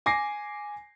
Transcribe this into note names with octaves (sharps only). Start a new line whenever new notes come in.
G#5 D6 A#6 C7